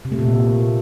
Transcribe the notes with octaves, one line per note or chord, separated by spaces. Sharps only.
C3
A3
A#2